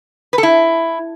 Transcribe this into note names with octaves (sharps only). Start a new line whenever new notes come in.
B4
A4
E4